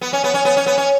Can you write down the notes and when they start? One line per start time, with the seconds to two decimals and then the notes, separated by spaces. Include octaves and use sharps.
0.01 B3
0.13 C#4
0.24 B3
0.34 C#4
0.45 B3
0.57 C#4
0.66 B3
0.78 C#4